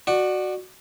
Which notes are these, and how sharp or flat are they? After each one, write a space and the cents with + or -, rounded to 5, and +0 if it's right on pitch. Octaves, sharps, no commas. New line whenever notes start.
F#4 +0 D5 +25